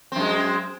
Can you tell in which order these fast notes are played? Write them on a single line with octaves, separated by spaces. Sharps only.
C4 F#2 G#3